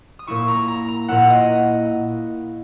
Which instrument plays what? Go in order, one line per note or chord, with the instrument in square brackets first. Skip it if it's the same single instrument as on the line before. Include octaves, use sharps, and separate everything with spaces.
[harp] D#6
A#2 A#3 E4 C#6
A#5
A#5
A#5
A#2 A#3 E4 F#5
D#5